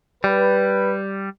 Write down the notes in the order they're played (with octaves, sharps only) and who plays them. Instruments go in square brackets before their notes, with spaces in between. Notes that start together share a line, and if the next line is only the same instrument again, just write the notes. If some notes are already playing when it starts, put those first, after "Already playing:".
[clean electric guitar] G3 [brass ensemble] B4